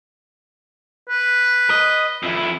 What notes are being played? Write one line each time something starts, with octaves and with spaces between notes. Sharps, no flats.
B4
D#5
F2 E4